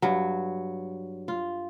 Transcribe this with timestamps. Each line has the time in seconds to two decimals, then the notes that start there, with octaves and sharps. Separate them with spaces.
0.02 G2 F#3
1.28 F4